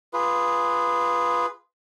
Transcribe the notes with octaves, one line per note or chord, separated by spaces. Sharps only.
F4 G#4 B4